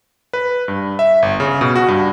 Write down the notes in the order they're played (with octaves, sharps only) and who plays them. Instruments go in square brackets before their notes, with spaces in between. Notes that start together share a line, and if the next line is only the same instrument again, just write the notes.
[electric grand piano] B4
G2
E5
G1
C#3
B2
F#4
G2